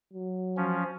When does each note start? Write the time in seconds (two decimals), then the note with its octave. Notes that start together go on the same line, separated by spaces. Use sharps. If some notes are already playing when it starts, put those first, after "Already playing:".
0.14 F#3
0.57 F3 C#4